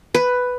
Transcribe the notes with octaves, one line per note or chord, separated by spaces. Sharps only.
B4